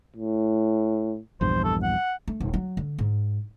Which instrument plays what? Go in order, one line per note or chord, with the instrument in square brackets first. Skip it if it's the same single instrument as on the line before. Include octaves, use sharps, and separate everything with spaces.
[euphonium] A2
[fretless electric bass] A#1 E2 G2 [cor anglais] C5
[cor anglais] A4
F#5
[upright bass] A3
D#1
F#3
D3
G#2